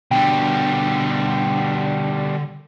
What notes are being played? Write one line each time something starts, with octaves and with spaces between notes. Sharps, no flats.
B2 D3 G3 G5